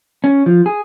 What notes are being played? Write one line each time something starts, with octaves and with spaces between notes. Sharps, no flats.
C#4
F3
G#4